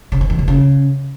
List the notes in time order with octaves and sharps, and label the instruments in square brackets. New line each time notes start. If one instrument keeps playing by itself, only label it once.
[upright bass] C#3
D#3
E2
C3
C#3